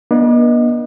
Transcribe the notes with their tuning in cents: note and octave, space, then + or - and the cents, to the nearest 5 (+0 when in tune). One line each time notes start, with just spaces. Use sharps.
B3 -45 D4 +5 D#5 +0